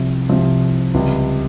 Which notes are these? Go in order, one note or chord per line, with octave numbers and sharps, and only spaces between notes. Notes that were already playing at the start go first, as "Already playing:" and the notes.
Already playing: C2 C3 F3
C2 C3 F3
C#2 C3 G3